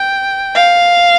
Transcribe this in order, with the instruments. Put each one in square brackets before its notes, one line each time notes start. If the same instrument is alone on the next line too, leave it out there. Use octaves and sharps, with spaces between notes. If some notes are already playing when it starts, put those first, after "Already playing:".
Already playing: [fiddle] G5
F5